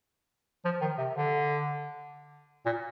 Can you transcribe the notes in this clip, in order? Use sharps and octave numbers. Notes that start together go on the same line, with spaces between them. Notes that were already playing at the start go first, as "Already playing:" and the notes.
F3
D#3
C3
D3
A#2